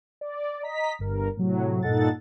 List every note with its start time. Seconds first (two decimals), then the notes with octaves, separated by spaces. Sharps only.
0.21 D5
0.62 D#5 A#5 B6
0.99 G1 G2 A#4
1.37 A2 C3 F#3
1.82 G2 A#2 D#4 A4 F#5 A6